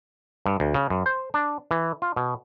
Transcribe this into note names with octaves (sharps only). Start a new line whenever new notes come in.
G2
D2
C#3
F#2
C5
D4
E3
F4
B2